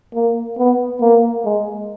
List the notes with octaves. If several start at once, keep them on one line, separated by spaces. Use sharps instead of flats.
A#3
B3
A#3
G#3